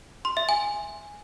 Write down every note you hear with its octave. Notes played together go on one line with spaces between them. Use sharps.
C6
E5
G#5